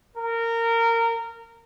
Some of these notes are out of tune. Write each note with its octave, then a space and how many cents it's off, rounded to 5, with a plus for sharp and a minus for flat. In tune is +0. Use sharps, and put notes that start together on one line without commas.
A#4 -20